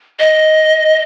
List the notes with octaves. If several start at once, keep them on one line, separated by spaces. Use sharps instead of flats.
D#5